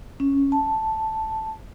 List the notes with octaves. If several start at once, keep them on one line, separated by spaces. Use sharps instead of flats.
C#4
A5